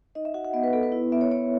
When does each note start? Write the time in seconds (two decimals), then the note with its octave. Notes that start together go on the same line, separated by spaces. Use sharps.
0.15 D#4 D#5
0.25 E5
0.34 F#4 F#5
0.45 F#5
0.53 B3 D#5
0.63 B4
0.73 B3 A4
0.83 B4
0.92 E4
1.12 B3 E5
1.21 C#5
1.31 B3 C#5